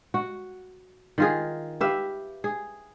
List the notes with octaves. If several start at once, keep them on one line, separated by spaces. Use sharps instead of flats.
F#4
D#3 F4 G#4
G4 B4 E5 F5
G#4